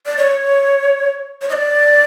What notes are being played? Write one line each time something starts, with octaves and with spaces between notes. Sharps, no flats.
D5
C#5
C#5
D#5
D5